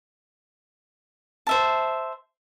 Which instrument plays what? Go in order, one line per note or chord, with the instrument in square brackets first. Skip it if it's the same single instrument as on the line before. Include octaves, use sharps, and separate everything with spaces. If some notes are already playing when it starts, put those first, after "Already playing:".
[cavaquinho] C5 E5 A5